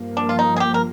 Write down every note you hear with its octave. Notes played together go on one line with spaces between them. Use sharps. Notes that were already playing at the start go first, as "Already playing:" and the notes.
Already playing: G2 F3 A#3
D4
F4
D#4
G#4
G4
A#4